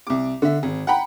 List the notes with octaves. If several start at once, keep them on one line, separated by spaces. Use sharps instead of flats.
C2 D6
D3 E5
G#1
F#5 G5 A#5 B5